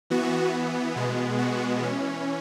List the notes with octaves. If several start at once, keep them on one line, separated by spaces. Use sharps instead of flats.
E3 B3 F#4
B2 G#3 B3
F#4
E3 C#4